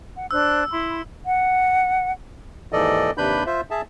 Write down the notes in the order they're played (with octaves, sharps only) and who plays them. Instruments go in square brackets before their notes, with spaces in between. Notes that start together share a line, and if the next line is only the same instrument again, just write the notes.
[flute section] F#5
[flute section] D4 C5 F#6 [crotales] E6
[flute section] E4 B5 C6
[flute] F#5
[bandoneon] D#2 G#2 E3 A4 D5 D#5
D#2 C3 D4 B4 B5 G6
F4 C5 E5
G#4 E5 A5